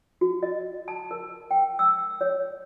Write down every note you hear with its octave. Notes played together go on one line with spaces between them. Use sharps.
F#4
D#5
A5
A#4
G5
E6
C#5